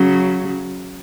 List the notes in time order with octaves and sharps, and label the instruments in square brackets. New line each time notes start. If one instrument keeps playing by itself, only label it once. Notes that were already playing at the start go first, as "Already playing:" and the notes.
Already playing: [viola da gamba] C#3 F#3